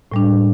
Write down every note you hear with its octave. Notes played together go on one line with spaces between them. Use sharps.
A2 G3 D4